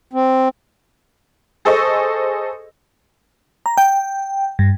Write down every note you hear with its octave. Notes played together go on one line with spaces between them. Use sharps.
C4
G#4 A4 C5 D#5 C#6
A#5
G5
G2